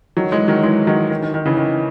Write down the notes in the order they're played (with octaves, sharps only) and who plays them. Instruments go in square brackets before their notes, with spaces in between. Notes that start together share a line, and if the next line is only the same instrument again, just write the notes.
[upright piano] D#3 F#3
E3 G#3
D#3 F#3
E3 G#3
D#3 F#3
D#3
D#3
D#3
C#3 E3
D#3